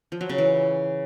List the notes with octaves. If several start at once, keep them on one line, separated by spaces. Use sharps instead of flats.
F3
F#3
C#3
E3